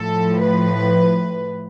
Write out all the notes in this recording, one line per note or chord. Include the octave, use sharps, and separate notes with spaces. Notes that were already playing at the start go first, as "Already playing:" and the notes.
Already playing: A2 F3 A4
B4